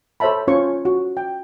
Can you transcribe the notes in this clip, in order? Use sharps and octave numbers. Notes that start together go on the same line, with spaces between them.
A4 C5 C#5 E5 A5 B5
C#4 F4 C5 C#5 C#6
F#4
G5